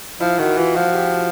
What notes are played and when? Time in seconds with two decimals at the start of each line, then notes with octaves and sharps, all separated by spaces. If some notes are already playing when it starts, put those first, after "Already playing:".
0.20 F3 E4
0.39 D#3 F#4
0.57 E3 F4
0.76 F3 F#4
0.94 G4